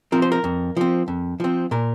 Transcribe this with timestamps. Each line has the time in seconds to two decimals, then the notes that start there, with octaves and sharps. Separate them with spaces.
0.12 F3 C4 A#4
0.22 C5
0.32 A#4
0.44 F2
0.76 F3 C4
1.08 F2
1.40 F3 C4
1.71 A#2 A#4